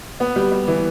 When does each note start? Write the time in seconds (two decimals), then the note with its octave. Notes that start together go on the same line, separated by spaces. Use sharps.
0.20 B3
0.36 G3
0.52 G3
0.68 E3